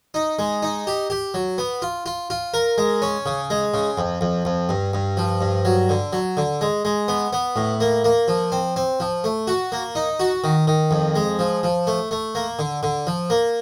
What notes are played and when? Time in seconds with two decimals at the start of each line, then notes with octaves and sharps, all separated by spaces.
0.14 D#4
0.39 G#3
0.63 D#4
0.87 G4
1.10 G4
1.34 F#3
1.58 B3
1.82 F4
2.06 F4
2.30 F4
2.54 A#4
2.78 G#3
3.02 C#4
3.26 C#3
3.50 G#3
3.74 C#3
3.98 F2
4.21 F2
4.45 F2
4.69 G2
4.93 G2
5.17 F3
5.41 G2
5.65 F#3
5.89 D3
6.13 F#3
6.37 D3
6.61 G#3
6.85 G#3
7.08 B3
7.33 B3
7.56 A2
7.80 A#3
8.04 A#3
8.28 F3
8.52 C4
8.76 C4
9.00 F3
9.24 A3
9.47 F#4
9.72 A#3
9.95 D#4
10.20 F#4
10.44 D#3
10.67 D#3
10.91 F2
11.15 G#3
11.39 F3
11.63 F3
11.87 A3
12.11 A3
12.35 A#3
12.59 D3
12.83 D3
13.07 F3
13.30 A#3